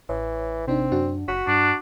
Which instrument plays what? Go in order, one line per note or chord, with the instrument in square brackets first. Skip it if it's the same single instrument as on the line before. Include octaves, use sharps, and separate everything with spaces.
[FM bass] A1 [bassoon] E3 [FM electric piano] C#5
[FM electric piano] C3 D4 D#4 [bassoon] C4
[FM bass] F#2 [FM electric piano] D4 F#4
[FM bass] F#1 [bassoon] F#4 [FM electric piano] B6
[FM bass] G2 [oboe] D4